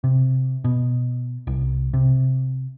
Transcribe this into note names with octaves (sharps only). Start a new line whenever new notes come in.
C3
B2
C2
C3